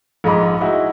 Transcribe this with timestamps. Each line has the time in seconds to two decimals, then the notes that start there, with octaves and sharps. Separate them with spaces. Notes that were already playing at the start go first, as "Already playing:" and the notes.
0.24 A#1 G#2 D#5 B5
0.61 D#4 E4 F#4 G#4